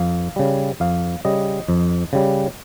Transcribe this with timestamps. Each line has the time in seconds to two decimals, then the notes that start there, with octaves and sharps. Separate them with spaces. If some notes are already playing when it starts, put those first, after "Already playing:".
Already playing: F2 F5
0.36 C#3 G3
0.80 F2 F5
1.25 C#3 G3 D#5
1.68 F2
2.13 C#3 G3